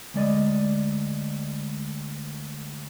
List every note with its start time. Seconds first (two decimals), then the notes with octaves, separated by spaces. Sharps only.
0.14 D2 G#3 D5 D#5